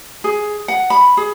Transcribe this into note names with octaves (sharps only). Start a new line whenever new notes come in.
G#4
F#5
B5
G#4